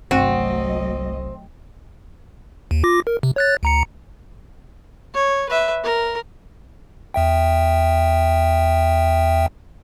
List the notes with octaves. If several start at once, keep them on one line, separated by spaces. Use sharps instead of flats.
G1 C2 F#3 A3 C4 F#4 D#5
D#2
F4 D6 A#6
A#4
C3
C#5 F#6 A6
D2 A#5 C#7
C#5
B4 E5
A#4
E2 E5 G5